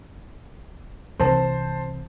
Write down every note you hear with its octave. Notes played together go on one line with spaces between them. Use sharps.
C2 C3 E3 C5 A5